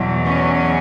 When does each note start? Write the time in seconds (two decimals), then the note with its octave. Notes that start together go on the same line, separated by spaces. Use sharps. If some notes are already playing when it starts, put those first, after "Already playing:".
Already playing: E2 B2 F#3
0.26 C#4